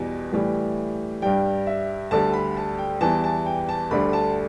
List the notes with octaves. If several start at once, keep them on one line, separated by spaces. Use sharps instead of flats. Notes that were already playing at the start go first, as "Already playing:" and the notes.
Already playing: E2 B2 G3
A2 E3 G3
G2 G3 G5
E5
D2 D3 G3 A5
B5
A5
G5
E2 E3 G3 A5
A5
G5
A5
D2 D3 G3 B5
A5